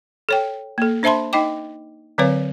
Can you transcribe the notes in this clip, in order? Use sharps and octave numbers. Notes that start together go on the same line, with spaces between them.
A4 C#5 G5
A#3 A4
D4 C5 E5 A5 B5 C6
D#4 D#5 G5 D6
D3 F#3 C4 B4 C#5 F5